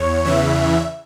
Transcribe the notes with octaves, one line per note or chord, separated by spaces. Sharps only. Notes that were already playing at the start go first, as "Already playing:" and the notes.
Already playing: E2 C#5
E2 C#3 E3 E5